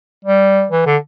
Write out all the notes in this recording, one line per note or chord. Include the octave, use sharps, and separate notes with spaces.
G3
E3
D3